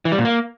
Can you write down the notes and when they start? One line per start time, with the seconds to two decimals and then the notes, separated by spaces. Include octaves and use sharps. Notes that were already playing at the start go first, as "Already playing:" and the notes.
0.05 E3
0.12 G3
0.18 A#2
0.25 A#3